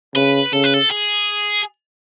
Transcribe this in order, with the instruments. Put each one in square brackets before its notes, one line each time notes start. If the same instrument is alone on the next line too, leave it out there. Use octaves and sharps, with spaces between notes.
[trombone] C#3 [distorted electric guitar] B4
[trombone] C#3 [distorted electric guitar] A4
[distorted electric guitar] B4
A4
G#4